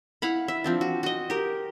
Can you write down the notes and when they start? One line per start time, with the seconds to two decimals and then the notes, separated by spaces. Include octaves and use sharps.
0.22 E4 F5 F#5 B5
0.48 E5
0.64 F3 C4 D4
0.81 F#4
1.03 F#4 D#5
1.30 G4 A#4